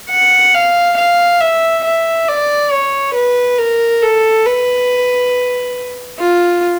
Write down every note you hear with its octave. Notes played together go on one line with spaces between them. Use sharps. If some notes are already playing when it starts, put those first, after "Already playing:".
F#5
F5
F5
E5
E5
D5
C#5
B4
A#4
A4
B4
F4